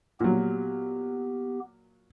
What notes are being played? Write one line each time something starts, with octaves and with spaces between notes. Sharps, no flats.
A#2 F#3 B3 G4